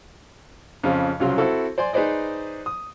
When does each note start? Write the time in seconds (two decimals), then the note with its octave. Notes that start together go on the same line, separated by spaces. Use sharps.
0.83 F2 C#3 F3
1.20 C2 C#3 F#3 F4
1.38 C4 E4 F#4 A4
1.78 C5 D5 G#5 C6
1.93 D#4 G#4 B4 C5 D5 D#5
2.66 D#6